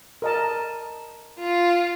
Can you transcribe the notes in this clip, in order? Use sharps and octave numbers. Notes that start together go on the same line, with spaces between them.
A#4 D#5 A5
F4